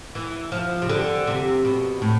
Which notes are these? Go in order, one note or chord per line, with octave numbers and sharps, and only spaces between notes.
E3
F3
C3
D3
C3
B2
A2